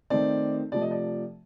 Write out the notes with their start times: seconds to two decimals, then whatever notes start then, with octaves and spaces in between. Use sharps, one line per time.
0.10 D#3 A3 C4 D#4 D5
0.72 C3 F3 A3 D5
0.81 D#5
0.91 D5